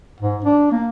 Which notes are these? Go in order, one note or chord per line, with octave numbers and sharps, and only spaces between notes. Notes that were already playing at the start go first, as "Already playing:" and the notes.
G#2
D4
A#3